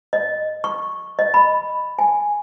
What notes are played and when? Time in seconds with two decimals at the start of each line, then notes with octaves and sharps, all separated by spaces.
0.13 D#5
0.64 C#6
1.19 D#5
1.34 B5
1.99 G#5